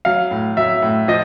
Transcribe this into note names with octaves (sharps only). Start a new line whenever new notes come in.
F#3 F5
A2
F#3 E5
A2
F3 D#5